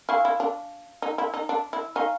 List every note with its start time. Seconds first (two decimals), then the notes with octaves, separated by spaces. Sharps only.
0.09 E4 F5 G#5 C#6 F6
0.25 E4
0.40 D4
1.02 D#4
1.18 E4
1.34 D#4
1.49 D4
1.73 E4
1.96 D#4 F5 G#5 C#6 F6